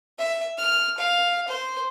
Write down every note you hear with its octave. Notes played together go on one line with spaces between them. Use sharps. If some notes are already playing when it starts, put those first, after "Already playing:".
E5
F6
F5
C5